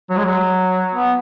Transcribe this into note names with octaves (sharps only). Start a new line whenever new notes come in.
F#3
G#3
F#3
B3